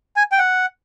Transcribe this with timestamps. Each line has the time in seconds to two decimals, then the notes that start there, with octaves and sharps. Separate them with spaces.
0.16 G#5
0.32 G5
0.39 F#5